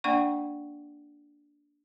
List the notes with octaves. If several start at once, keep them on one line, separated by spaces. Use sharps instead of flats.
A#3 D4 D5 F#5 G5 C#6